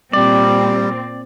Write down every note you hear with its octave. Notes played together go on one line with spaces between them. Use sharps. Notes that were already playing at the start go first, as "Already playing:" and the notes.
A#2 G3 C4 D5